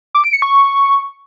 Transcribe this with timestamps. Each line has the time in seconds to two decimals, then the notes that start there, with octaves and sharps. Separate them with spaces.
0.15 D6
0.24 D7
0.33 C#7
0.42 C#6